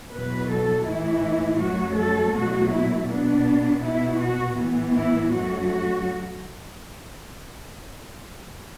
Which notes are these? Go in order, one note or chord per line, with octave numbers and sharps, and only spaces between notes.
E2 B2 F#3 B4
A4
A2 E3 A3 E4
F#2 F#3 A3 F#4
A4
E2 B2 F#3 A3 F#4
E4
B2 B3 D4
B2 B3 E4
F#4
A2 E3 B3
E4
F#2 F#3 A3 F#4
F#4